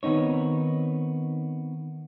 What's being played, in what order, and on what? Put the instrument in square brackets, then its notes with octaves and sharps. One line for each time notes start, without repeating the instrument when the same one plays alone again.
[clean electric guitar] D#3 B3 C4 D#4 C#5